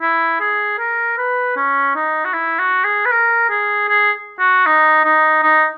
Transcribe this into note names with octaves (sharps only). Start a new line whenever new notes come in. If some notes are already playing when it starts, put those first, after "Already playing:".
E4
G#4
A#4
B4
C#4
D#4
F#4
E4
F#4
G#4
B4
A#4
G#4
G#4
F#4
D#4
D#4
D#4